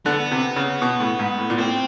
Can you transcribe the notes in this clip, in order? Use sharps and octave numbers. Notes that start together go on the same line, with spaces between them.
D3 B3
C3
C#3
B2
A2
G#2
A2
A#2
A2 C4